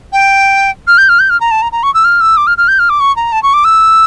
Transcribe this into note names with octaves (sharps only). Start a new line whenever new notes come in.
G5
F6
G6
F6
G6
F6
A#5
A5
A#5
A#5
C#6
E6
F6
E6
D6
F6
F6
G6
F6
D6
C#6
A#5
A5
C#6
D6
E6